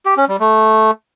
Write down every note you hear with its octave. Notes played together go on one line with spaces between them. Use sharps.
G4
C#4
G3
A3